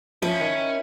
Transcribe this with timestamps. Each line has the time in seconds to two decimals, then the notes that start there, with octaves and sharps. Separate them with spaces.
0.22 F3 C#4 E4
0.40 D#3 C#7